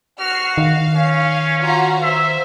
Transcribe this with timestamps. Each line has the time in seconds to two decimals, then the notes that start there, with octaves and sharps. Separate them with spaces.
0.19 F#4 F6 C7
0.58 D#3 F5
0.96 C#4
1.61 F4 F#4 A#5
2.03 C5 E5